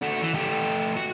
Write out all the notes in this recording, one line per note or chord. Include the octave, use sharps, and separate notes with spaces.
A3 F#4
E3
A3 G4
F#4